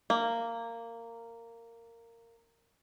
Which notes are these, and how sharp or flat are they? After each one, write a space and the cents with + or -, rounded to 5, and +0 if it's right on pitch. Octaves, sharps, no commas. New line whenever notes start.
A#3 -15